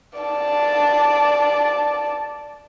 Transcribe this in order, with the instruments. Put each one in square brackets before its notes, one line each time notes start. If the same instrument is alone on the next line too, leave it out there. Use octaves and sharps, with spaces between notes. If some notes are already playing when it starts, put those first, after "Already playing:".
[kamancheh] D5 A5